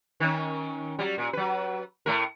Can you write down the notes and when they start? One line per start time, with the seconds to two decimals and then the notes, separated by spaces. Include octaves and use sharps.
0.20 D#3 C#4
0.99 F#3 G3
1.18 A#2
1.33 F#3 B4
2.06 A2 A3 A#4